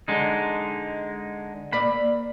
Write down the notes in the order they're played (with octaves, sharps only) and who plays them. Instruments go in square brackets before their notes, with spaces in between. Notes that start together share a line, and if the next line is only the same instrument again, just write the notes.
[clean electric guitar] D3 G#3 D#4
[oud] A#3 D5 E5 [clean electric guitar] B5